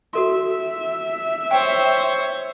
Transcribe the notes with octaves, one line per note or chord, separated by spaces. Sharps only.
F#4 A4 E5 C6
C5 C#5 G5